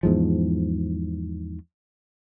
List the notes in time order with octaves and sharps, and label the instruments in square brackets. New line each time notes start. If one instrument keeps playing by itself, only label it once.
[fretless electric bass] E2 G#2 F3